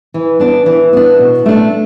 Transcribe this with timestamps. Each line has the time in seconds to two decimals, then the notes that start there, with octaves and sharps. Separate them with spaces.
0.14 E3
0.40 B3 D4
0.66 E3
0.93 B3 D4
1.19 B2
1.46 A3 D4